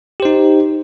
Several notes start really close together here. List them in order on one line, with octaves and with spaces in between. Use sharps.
G4 C5 D#4